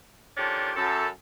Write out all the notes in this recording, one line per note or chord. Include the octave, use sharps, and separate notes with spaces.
D#3 F3 C#4 D4 G4 A4
F#2 A4